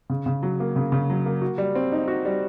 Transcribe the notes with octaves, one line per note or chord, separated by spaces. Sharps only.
C#3
C#3
F#3
A#3
C#3
C#3
F#3
A#3
F#4
G3
C4
D#4
F#4
G3